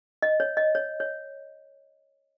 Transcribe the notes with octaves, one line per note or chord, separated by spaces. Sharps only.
D#5
C#5
D#5
C#5
C#5